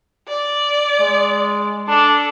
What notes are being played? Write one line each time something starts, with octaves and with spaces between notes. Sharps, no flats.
D5
G#3
D4 A4